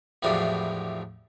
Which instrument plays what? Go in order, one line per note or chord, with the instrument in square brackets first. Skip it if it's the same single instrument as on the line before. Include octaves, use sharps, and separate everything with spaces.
[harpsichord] E2 A2 C3 F3 F#3 D4